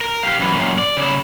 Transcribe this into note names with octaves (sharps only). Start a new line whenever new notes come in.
A#4
G4 F5
F#2 E3
F#2 A#2
D5
C#3 E4